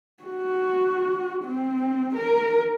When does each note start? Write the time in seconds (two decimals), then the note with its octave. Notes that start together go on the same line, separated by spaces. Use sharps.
0.23 F#4
1.44 C4
2.15 A#4